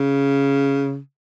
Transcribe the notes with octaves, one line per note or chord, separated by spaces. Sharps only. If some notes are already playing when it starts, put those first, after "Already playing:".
Already playing: C#3